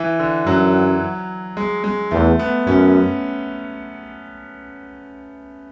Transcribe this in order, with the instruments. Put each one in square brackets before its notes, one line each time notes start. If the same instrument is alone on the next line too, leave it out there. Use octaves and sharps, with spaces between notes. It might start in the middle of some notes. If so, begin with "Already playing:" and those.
Already playing: [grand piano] E3
D3
[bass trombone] F#2 [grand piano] F#3
[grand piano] G#3
G#3
[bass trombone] E2 [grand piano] A3
[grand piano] B3
[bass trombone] F#2 [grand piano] C#4